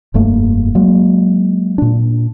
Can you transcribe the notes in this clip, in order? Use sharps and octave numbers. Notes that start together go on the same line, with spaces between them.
F1 G2 A3 A#3
F#3 G#3 A#3
A#2 D4